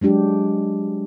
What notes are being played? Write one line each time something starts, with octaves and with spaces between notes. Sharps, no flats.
F#3 G#3 D4 G4